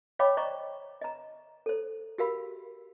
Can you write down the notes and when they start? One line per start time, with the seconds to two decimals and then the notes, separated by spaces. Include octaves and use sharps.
0.19 C#5 D#5 F5 G5 B5 D6
0.37 C5 D5 D#5 A#5 C#6
1.01 D#5 A#5
1.66 A4 C5
2.18 F#4 G4 A#4 F5 B5